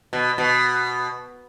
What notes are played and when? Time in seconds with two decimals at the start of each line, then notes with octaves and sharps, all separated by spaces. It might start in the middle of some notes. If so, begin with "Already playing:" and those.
0.13 B2
0.38 B2